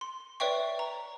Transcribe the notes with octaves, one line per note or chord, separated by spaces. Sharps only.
C6
B4 C#5 D5 E5 G5 C#6
A#5